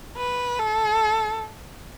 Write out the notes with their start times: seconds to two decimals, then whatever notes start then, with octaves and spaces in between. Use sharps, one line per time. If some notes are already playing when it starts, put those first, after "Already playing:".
0.17 B4
0.59 A4